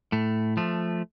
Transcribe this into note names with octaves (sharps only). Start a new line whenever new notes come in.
A2 A3
F3 A3